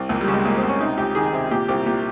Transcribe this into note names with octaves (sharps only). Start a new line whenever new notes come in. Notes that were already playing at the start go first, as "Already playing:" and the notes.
Already playing: C2
C#2 A#3
G3
C#3
G#3
C#2 A#3
C4
C#2
C#4
C3 D#4
C#2 G4
D#3 G#4
C3
A#2 G4
C2 G4
A#2 G4